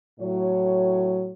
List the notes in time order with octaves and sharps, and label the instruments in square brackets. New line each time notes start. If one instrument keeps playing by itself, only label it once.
[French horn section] A2 F#3 C#5